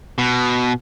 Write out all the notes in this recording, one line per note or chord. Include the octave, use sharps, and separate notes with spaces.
B2